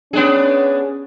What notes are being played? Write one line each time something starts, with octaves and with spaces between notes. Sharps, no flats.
B3 C#4 D4 G#4